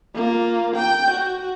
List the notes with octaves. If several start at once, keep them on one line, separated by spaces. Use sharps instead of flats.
A#3 F4
G5 G6
F#4